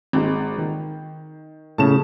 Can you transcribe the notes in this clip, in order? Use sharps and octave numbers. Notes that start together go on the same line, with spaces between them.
G#1 G#3
D#3
A2 C#3 A5 E7